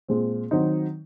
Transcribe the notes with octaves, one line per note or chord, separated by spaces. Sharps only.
A#2 G#3 C4
D#3 F#3 C4 D#4